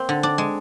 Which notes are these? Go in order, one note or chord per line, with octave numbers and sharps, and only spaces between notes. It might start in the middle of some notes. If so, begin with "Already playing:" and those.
Already playing: A#3 C4
D3
D4
G#3